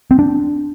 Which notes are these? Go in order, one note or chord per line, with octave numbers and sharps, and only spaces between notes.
C4
D4